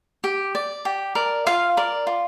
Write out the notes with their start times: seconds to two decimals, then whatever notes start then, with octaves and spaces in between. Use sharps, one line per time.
0.24 G4
0.55 D5
0.85 G4
1.15 A#4 D5
1.47 F4 F5
1.77 A#4 D5
2.07 F4